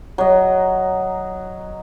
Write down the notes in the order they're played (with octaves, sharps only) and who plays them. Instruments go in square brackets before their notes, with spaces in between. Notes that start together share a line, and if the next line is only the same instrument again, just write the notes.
[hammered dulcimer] F#3 D#5